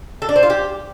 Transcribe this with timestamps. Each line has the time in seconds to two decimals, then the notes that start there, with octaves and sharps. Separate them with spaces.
0.22 A4
0.29 D4
0.36 C4
0.43 F4
0.50 G4